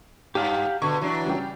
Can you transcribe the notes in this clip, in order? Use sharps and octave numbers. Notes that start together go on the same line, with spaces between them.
G2 G4 F5 F#5
B2 D3 C#6
E3 F#3 D4
C#3 G3 G4